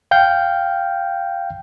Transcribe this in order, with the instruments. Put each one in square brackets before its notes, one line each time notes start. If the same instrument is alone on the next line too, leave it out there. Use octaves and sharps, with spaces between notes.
[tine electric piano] F5 G5 G6